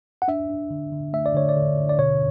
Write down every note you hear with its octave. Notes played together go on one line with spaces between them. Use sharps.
F#5
D4 E5
D4
D3
D3
A3 E5
D5
D3 C#5
D5
D3
D3
D5
B2 C#5